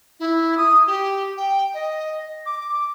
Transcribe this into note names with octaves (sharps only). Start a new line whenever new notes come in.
E4
D#6
G4
G5
D#5
D6